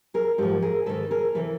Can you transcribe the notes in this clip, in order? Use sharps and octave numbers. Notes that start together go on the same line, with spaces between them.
G#4 A#4
G#2 F3 G4 A4
G#4 A#4
G#2 D#3 A4 B4
G#4 A#4
C3 E3 A4 B4